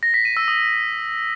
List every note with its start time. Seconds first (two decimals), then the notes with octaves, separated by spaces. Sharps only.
0.03 A#6
0.14 B6
0.25 D#7
0.37 E6
0.48 D#6